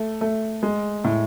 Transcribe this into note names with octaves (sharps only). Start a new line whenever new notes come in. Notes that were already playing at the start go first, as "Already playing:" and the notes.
Already playing: A3
A3
G#3
A2